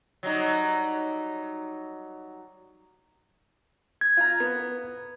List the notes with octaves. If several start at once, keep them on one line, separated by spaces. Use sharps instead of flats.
F#3 G3 D#4
G#6
F4 A#5
B3